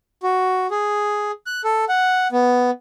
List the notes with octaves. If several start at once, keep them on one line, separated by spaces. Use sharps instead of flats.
F#4
G#4
F#6
A4
F#5
B3